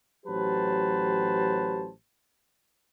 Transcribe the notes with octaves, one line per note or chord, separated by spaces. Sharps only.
A1 F#3 G4 B4 C5 A5